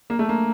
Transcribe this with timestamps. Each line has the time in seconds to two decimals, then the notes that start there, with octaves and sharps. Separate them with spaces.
0.10 A#3
0.19 A3
0.29 A#3